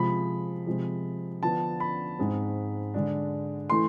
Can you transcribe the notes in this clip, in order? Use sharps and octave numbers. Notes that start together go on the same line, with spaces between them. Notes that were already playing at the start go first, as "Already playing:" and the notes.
Already playing: C3 F3 G#3 B5
C3 F3 G#3
D3 F3 B3 D4 A5
B5
G#2 G#3 C4
D3 G#3 D4
E3 A3 C6